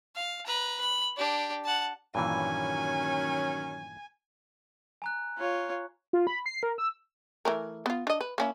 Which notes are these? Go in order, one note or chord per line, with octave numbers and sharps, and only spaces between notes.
F5
B4 A#5
B5
D4 G4
F#5 A5
G2 A#2 D#3 E3 F#3 C#4 G#5
G#5 A#5 F#6
F4 C#5
F4
B5
C7
A#4
E6
E3 A3 A#4
B3 F4
D4 D#5
B4
A#3 C#4 E4